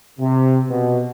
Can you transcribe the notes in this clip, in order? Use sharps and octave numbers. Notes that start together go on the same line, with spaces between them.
C3
B2